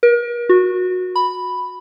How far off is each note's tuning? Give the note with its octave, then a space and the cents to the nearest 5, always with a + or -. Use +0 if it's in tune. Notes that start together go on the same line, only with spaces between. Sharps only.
A#4 +40
F#4 -20
B5 +0